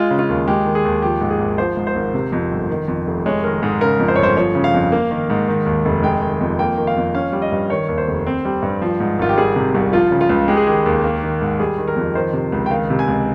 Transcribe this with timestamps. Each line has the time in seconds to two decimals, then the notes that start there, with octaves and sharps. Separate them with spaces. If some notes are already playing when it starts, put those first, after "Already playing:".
Already playing: G#3 F4
0.10 C#3
0.19 F4
0.29 D#2
0.48 G#3 G4
0.66 D#3
0.75 G#4
0.85 D#2
1.02 F3 G4
1.21 G#2
1.30 G#4
1.39 G#1
1.58 F3 C5
1.77 G#2
1.87 C5
1.95 G#1
2.14 C3
2.32 F2
2.51 G1
2.69 D#3
2.88 F2
3.07 F1
3.26 G#3 C#5
3.44 D#3 A#4
3.63 G#2 G#4
3.81 C#3 A#4
3.99 F2
4.08 C5
4.16 C#5
4.18 G1
4.23 C5
4.37 F3 C#5
4.55 C#3
4.64 F5
4.74 F2
4.92 A#3
5.11 D#3
5.30 G#2
5.48 D#3
5.66 D#2
5.85 F1
6.03 G#3 G5
6.21 D#3
6.41 F2
6.59 A#3 G5
6.77 D#3
6.87 F5
6.96 F2
7.15 C#4 F5
7.33 G3
7.42 D#5
7.52 G2
7.70 D#3 C#5
7.88 D#2
7.98 C5
8.08 F1
8.27 C4
8.45 G3
8.62 G2
8.82 F3
9.00 G#2
9.19 G#1 F4
9.29 G4
9.38 G3 G#4
9.56 C3
9.74 C2
9.93 F3 F4
10.11 C#3
10.21 F4
10.29 C#2
10.48 G#3 G4
10.57 G#4
10.67 D#3 G4
10.86 D#2
11.04 A#3
11.23 D#3
11.41 G#2
11.60 G3 G#4
11.78 D#3
11.88 A#4
11.96 F2
12.15 D#3 C5
12.33 C3
12.52 C#2
12.66 G5
12.70 D#3 F5
12.90 C3
12.99 G#5
13.08 C#2